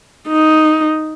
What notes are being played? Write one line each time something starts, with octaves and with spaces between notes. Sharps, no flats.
D#4